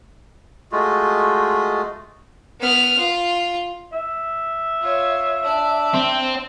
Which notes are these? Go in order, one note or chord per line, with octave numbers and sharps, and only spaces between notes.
G#3 A3 F4 F#4
B3 F6
F4
E5
F4 C#5
D4 D5
C4